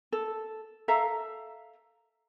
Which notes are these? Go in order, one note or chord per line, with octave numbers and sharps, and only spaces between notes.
A4
A4 E5 F5 A#5